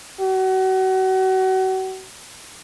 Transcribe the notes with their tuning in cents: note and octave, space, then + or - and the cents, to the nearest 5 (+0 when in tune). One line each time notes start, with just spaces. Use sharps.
F#4 +35